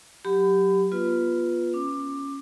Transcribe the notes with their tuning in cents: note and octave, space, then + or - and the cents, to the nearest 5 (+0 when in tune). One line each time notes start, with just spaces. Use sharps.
F#3 +0 G4 +0 B5 +30
B3 -40 F4 +0 B4 +0
C#4 +0 D6 +15